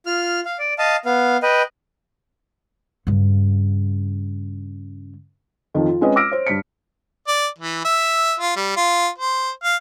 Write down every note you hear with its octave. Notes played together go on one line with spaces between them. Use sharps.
F4 F6
F5
D5
D#5 F5 A5
B3 F5
B4 D#5 G5
G2 C#3
F2 D#3 F3
F4
G#3 C4 C#4 B4 C#5 D#5
D6 E6 F6 A#6 D7
C5 C#5
G2 B6 C#7
D5
E3
E5
F4
G3
F4
C5
F5